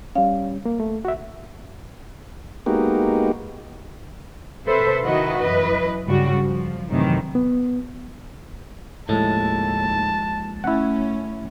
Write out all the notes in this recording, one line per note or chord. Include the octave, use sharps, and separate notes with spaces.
G3 C#4 F5
A#3
A3
F#4 E5
G#3 A#3 B3 D#4 F#4 G4
C3 A4 B4 C5 E5
D#3 E4 F#4 B4 D#5
F#2 E3 B4 D#5
G2 C#3 G3 F#4
F3
F#2 A2 C3 D#3 E3
B3
D#2 A2 F3 G#3 A4 A5
A3 C#4 E4 F#5